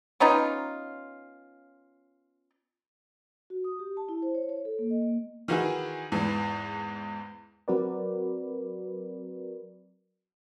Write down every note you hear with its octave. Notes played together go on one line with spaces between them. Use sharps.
B3 C#4 D#4 F4
F#4
D#6
G4
A5
E4
C5
C#5
C#5
A4
A#3
D#5
A#3
D#3 E3 F#4 G#4
E2 G#2 E3
F#3 C4 F#4 A#4 B4 D5